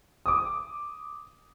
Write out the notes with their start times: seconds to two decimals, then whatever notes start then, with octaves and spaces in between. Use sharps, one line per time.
0.26 D6 D#6